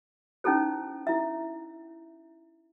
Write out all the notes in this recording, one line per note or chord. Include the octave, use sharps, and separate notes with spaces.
C#4 D#4 E4 A4 C5
E4 E5